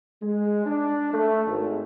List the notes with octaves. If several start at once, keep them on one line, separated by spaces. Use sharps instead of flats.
G#3
D4
A3
G#1